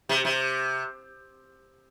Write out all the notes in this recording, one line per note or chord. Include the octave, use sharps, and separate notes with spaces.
C3
C3